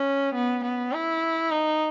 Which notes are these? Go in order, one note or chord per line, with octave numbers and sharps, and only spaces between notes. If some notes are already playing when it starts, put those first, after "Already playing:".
Already playing: C#4
B3
B3
E4
D#4